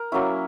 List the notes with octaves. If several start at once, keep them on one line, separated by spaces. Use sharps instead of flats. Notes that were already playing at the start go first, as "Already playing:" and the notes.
Already playing: A#4
F#3 A#3 C#4 E4